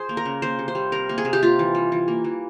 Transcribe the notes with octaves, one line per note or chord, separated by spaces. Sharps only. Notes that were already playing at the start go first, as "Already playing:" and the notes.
Already playing: G#4 C5
A#3
A#4
C#3
A#3 C5
C3
C5
G3
C3 A#4
A#3
G#4
C3
G4
A#3 F4
E3
G3
E3
A#3
E3